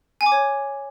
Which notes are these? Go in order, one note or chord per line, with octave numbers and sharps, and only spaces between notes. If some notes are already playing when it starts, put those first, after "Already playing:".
G#5
D6
C#5